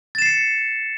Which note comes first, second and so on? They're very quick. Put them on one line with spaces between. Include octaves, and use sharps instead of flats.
A6 E7 C7 C#7